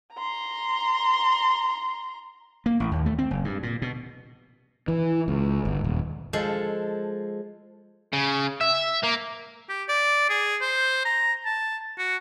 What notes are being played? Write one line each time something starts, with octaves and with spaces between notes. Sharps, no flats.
A#5 C6
A#3
A1
D#2
A3
C4
F#1
G2
A#2
B2
E3
C#2
G1
D#1
F3 G#3 A4
C#3
E5
A#3
G4
D5
G#4
C5
A#5
A5
F#4